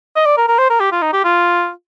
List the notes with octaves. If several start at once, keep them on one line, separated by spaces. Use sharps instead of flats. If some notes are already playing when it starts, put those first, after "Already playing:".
D#5
D5
A#4
A#4
C5
A#4
G4
F4
D#4
G4
F4